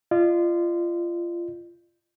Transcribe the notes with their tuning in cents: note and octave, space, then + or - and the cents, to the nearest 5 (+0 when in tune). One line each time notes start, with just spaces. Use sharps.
F4 -25 D#5 -45